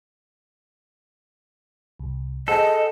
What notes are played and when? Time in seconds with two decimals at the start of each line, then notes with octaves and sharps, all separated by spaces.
1.99 C2
2.48 G#4 A4 C5 D#5 F#5